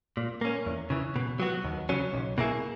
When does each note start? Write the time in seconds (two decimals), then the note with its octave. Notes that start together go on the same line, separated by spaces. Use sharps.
0.17 A#2
0.41 A#3 C#4
0.66 E2
0.90 C#3 E3
1.16 B2
1.40 F#3 B3 F#4
1.64 D#2
1.89 C#3 F#3 C#4
2.13 B1
2.38 B2 A#3 E4 G#4